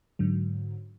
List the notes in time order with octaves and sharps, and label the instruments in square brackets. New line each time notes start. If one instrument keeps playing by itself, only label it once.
[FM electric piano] G#2 D3 F#3